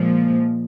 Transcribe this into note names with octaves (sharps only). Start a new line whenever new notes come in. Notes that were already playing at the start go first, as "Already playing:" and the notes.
Already playing: A#2 F3 G#3